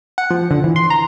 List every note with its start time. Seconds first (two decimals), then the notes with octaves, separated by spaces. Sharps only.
0.18 F#5
0.31 F3
0.51 D3
0.64 E3
0.76 C6
0.90 A#5